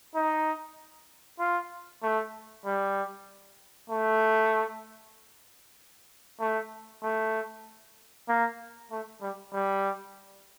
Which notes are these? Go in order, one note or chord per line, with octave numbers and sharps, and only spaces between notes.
D#4
F4
A3
G3
A3
A3
A3
A#3
A3
G3
G3